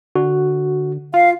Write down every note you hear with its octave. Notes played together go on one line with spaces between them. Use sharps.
D3 F#4
F4 F5